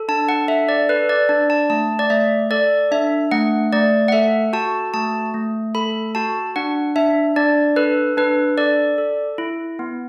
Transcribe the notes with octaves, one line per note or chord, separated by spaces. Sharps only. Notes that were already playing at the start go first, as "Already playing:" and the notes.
Already playing: A4
D4 A5
F#5
A4 E5
D5
A4 B4
D5
D4 D5
A5
A3 A5
D5
A3 E5
A4 D5
D4 E5
A3 F#5
A3 D5
F#5
A4 E5
F#4 A5
A3 A5
A3
A4 B5
F#4 A5
D4 F#5
D4 E5
D4 D5
A4 B4
D4 B4
A4 D5
A4
E4
B3